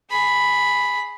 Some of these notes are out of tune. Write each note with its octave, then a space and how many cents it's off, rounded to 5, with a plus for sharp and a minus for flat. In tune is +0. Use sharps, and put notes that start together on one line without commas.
G#4 +5 B5 +0